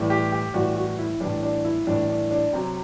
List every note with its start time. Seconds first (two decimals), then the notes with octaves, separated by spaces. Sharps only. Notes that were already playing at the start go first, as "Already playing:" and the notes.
Already playing: A2 E3 G3
0.10 G4
0.32 G4
0.54 A2 E3 G3 F#4
0.76 F#4
0.98 E4
1.20 A2 E3 G3 D4
1.43 D4
1.65 E4
1.87 A2 E3 G3 D4
2.09 D4
2.31 D4
2.53 C3 F#3 C4